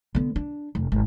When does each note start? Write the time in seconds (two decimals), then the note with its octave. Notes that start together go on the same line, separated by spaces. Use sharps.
0.15 D3 B3
0.36 D4
0.75 F1
0.92 G#1